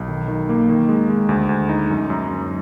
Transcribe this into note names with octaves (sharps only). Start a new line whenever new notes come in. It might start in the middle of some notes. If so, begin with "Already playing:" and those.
Already playing: B1
D#3
D#3
A#3
D#3
G#3
G#3
D2
D2
D#4
F#2
F#2
F#2